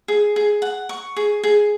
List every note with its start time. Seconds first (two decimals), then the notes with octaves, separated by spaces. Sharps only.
0.08 G#4
0.36 G#4
0.62 F#5
0.89 C#6
1.16 G#4
1.44 G#4